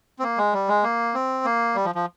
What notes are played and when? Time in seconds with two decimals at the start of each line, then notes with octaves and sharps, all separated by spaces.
0.19 C4
0.23 A#3
0.38 G#3
0.53 G3
0.68 G#3
0.84 A#3
1.14 C4
1.45 A#3
1.75 G3
1.85 F3
1.95 F3